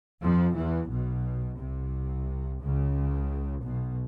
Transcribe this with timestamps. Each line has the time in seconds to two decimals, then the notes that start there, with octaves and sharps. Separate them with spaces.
0.21 F2 F3
0.56 E2 E3
0.89 B1 B2
1.58 C2 C3
2.61 C#2 C#3
3.63 B1 B2